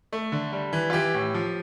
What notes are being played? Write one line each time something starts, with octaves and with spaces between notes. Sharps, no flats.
A3
D3
G3
E3
F4
E3 G4
A2
F3